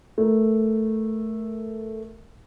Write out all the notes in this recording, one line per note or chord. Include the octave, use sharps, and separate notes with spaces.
A3 A#4